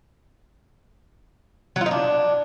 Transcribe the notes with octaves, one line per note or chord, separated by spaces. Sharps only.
F#3
F4
D#4
D4